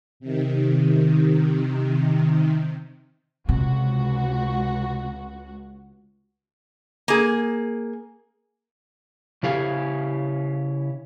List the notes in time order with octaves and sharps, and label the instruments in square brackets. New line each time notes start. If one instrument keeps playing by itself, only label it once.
[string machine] C3 D#3
[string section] C#2 F#4 [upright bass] C3
[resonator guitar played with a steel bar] A#3 G#4
[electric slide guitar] C#3 E4 G4 F5 G#5